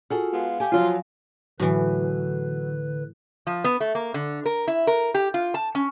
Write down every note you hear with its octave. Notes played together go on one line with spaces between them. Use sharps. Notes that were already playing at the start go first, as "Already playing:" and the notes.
F4 F#4 G#4 A4
G#3 B3 F4 F5
A3 G4 G#5
F3 F#3 F4
A2 D3 E3 F#3 B4
F3
B3
A3
A#3
D3
A#4
E4
A#4
G4
F4
A5
C#4